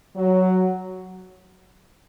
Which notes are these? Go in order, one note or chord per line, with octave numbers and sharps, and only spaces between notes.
F#3